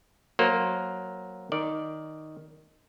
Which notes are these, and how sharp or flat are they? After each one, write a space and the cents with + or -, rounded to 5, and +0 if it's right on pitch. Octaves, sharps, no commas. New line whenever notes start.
F#3 +0 A#3 +0 C5 +10
D#3 +0 D5 +0